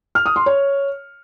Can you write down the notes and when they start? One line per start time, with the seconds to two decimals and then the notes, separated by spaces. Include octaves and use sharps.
0.15 F6
0.26 D#6
0.36 C6
0.46 C#5